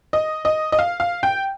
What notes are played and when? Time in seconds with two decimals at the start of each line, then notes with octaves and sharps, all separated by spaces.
0.13 D#5
0.45 D#5
0.72 D#5
0.79 F5
1.00 F5
1.23 G5